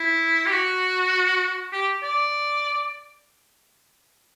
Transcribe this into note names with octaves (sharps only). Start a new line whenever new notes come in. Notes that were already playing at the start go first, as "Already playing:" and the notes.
Already playing: E4
G4
F#4
G4
D5